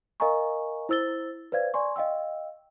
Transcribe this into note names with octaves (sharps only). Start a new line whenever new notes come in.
A#4 D#5 F5 G#5 A#5 C#6
E4 C5 E6 A6 G7
B4 C5 D5 F5 G#6
D5 G#5 C6 C#6
D#5 F5 G5 E6